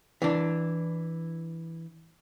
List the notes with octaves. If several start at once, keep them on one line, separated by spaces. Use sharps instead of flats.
E3 D4